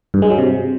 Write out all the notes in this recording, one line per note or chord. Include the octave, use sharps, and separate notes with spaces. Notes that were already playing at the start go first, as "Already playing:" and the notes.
G2
G#3
F#3
C3